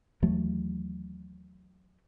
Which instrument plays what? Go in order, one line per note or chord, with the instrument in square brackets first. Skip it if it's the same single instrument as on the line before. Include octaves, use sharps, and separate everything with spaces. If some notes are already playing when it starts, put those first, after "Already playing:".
[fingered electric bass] D#2 E3 F#3 A3